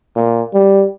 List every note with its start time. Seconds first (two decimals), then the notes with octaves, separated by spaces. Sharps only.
0.16 A#2
0.53 G3